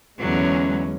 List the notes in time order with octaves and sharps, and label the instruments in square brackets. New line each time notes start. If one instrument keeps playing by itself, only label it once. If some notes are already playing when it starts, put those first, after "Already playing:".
[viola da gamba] E2 D3 F#3 [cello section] G#3 C#4